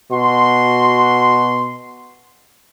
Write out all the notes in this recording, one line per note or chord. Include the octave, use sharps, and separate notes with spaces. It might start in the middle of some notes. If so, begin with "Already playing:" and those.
B2 F#4 C6